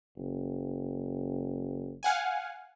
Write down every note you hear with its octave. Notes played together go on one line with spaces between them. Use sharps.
F#1
F5 F#5 G#5